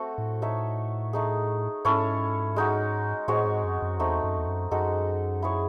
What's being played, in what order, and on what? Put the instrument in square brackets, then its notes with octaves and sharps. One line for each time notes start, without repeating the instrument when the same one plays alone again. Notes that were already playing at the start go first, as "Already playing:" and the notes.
Already playing: [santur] A3 C4 F#4 A4
[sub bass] A2
[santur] D#4 A4 C#5 E5
A3 D#4 G#4
[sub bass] G#2 [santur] C#4 E4 A4 C#5
[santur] G#3 D#4 F#4
[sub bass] A2 [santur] G#3 C4 F#4 C#5
[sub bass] G#2
F#2
F#2
[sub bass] E2 [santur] A3 C4 D#4
[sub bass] F#2
E2
F#2
[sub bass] F#2 [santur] G#3 D#4 F#4 A4
[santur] E4 G#4 C#5